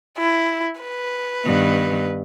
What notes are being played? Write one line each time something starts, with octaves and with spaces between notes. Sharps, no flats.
E4
B4
G2 D#3 B3